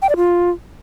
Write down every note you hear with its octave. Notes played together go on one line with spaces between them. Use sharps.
G5
D5
F4